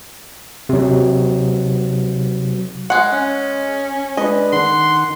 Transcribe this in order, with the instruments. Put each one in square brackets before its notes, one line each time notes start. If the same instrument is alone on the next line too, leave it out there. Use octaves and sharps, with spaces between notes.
[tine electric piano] C3 F#3
[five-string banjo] G#3 F#5
[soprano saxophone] C#4
[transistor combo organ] G#3 D4 B4 [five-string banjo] D#5
[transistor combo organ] D#3 F#5 [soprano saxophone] C6